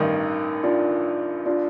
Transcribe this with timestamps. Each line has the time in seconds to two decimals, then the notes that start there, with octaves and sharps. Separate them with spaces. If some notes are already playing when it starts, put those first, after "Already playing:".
Already playing: A1 G2 D#3 D#4
0.63 D4 F4
1.46 D4 F4